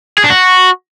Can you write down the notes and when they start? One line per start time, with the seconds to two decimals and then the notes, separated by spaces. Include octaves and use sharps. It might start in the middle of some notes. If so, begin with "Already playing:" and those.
0.18 G#4
0.24 D4
0.30 F#4